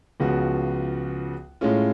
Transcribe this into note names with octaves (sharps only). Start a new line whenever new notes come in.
C#2 C#3 F3 B3 F#4
A2 G#3 C#4 F4